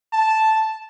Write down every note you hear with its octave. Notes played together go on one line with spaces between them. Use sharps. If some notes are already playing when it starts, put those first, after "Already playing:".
A5